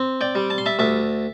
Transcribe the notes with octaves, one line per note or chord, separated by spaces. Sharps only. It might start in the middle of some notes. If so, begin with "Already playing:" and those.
Already playing: C4
D5 G5
G3
A5
C6
E5 A5
D2 E5 A5